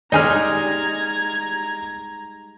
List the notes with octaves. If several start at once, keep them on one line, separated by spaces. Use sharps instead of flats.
G3 G#3 D#4 D#5 G#5 A#5 F6 G#6